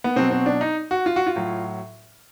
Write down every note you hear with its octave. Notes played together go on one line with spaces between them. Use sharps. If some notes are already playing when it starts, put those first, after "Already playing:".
B3
B2 F#3 C4
C4
D4
D#4
F#4
F4
F#4
F4
A2 F#3